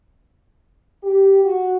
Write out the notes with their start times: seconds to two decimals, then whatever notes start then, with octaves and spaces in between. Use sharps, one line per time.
1.03 G4
1.44 F#4